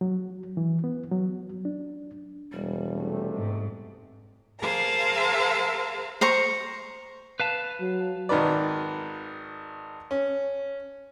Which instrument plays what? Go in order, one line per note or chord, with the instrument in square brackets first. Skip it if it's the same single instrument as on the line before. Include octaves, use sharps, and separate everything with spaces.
[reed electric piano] F#3
E3
B3
F#3
D4
[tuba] E1 [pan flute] G3
[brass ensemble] C3 A3
[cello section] G#2
[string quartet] G#4 A#4 C5 F5 A5 A#5
[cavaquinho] C5 A#5 C#6
[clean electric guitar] B4 F5 A5
[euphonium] F#3
[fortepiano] G#1 D#3 A#4 B4 D5
C#4